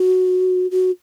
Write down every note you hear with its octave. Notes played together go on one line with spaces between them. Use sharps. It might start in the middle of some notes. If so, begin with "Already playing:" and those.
Already playing: F#4
F#4